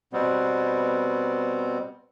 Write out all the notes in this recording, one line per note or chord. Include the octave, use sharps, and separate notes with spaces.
B2 G3 B3 C4